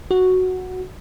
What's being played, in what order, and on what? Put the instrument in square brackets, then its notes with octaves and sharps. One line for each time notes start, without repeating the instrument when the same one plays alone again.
[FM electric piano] F#4